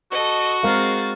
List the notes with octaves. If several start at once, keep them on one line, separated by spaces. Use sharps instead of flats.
F#4 A4 D#5
G#3 C4 A#4 F5 A6